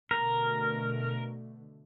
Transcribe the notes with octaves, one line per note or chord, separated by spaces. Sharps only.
B2 D3 A3 A#4